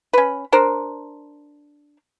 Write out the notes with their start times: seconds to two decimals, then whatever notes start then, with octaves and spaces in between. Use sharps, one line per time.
0.13 C#4 B4
0.52 D4 A#4 C5